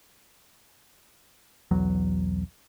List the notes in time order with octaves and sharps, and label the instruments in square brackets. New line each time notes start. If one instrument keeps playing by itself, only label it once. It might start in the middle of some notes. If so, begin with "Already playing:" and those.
[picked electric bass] B1 E2 F#3